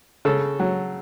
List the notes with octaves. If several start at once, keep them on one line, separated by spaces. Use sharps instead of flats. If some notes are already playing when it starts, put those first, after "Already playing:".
C#3 A4
F#3